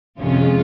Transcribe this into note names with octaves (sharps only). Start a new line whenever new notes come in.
F2 C3 D#3 G#3 C#4 F4